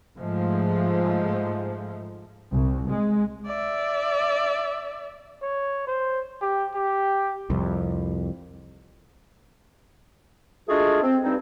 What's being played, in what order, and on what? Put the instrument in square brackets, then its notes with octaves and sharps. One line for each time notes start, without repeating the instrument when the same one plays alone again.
[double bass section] G#2 F3 G#3 A3
C2
G#3
[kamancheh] D5 E5
[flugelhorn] C#5
C5
G4
G4
[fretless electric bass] C2 F2
[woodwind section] G#3 A3 D4 F4 F#4 G#4
C4
G2 C4 D#4